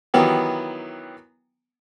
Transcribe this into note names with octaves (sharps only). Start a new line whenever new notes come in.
D#3 E3 F#3 B3 G4